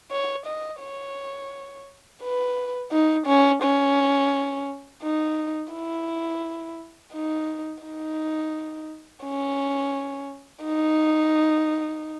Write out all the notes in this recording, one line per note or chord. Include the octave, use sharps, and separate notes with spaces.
C#5
D#5
C#5
B4
D#4
C#4
C#4
D#4
E4
D#4
D#4
C#4
D#4